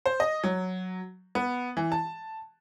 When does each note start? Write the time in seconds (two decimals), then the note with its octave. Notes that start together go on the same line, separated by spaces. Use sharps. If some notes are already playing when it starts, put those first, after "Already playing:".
0.06 C5
0.20 D#5
0.44 F#3
1.35 B3
1.77 E3
1.92 A5